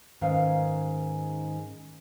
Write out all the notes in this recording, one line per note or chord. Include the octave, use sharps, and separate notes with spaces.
G#2 D#3 G#3 C#4 B4 F5